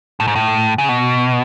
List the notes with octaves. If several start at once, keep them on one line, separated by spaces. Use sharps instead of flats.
A2
G#2
A2
C#3
B2